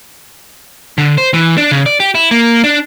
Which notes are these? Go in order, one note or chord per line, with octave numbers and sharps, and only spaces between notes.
D3
C5
E3
D4
C#3
D5
G4
E4
A#3
D4